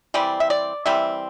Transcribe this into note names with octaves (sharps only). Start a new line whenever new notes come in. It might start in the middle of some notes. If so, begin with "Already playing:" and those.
E3 G3 C4 D5
E5
D5
E3 G3 C4 E5